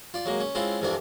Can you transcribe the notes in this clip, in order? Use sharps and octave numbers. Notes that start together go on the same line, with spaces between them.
F4 D5
F#3 G#3 A#3
C#4
G#3 C4 C#4 E4 F4
C2 F2 C3 E3 D4 G#5